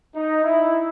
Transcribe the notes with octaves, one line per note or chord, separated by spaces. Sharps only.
D#4
E4